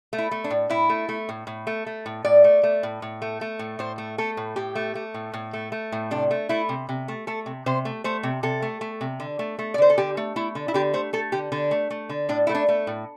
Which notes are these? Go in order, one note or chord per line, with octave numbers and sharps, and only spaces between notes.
A3
E4
A3
D4
A2
A2 E4
A3
A3
A2
A2
A3
A3
A2
A2 D5
A3
A3
A2
A2
A3
A3
A2
A2 C5
A3
A3 A4
A2
A2 G4
A3
A3
A2
A2
A3
A3
A2
C3 D4
A3
A3 E4
C3
C3
A3
A3 A4
C3
C3 C5
A3
A3 C5
C3
C3 A4
A3
A3
C3
D3
A3
A3
D5
D3 C5
A4
D3 G4
A3
A3 E4
D3
E4
D3 G4
A3 C5
A3 A4
D3 G4
D3 D4
A3
A3
D3
A2 D4
A3 E4
D4
A3
A2